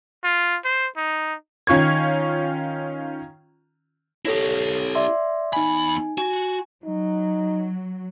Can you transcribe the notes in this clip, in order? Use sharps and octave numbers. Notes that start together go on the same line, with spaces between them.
F4
C5
D#4
D#3 C#4 F4 C#6 G#6
E4 G4 A4 C#5 A#6
D5 E5 C6
E2 D#4 G#5 B5
F#4 G#5
F#3 D#4